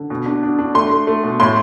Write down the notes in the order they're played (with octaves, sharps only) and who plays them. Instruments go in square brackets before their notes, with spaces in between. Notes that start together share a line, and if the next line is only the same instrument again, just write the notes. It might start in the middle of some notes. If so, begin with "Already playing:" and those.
Already playing: [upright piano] D3
B2
D4
D4
D4
A3 C6
A3
A3
B2
A2 C6